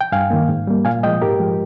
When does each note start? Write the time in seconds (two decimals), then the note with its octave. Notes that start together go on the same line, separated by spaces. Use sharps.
0.01 G5
0.12 G2 F5 G#5
0.30 D#3 A#3
0.49 G#2
0.67 G3 A#3
0.85 A#2 F5 G#5
1.03 G#3 D#5 G5
1.06 F3
1.22 G#2 G4 A#4
1.40 F3 G#3